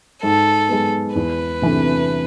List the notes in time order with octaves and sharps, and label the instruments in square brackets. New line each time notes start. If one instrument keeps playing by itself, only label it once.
[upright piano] G#2 [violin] A4
[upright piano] G#3 B3
[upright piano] E2 [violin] B4
[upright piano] C3 E3 A3 D4